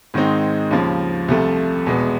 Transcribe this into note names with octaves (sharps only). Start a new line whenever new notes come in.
G#2 D#3 G#3 C4 D#4
D#2 C#3 F3
C2 C3 F3 A3
E2 B2 G#3 B3